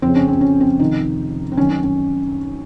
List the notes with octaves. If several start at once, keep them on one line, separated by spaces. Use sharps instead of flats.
F2 C#3 C4
C#4
C4
C#4
C4
F2 C3 D#3 D#4
C4
F#2 D#3 C#4
C#4
C#4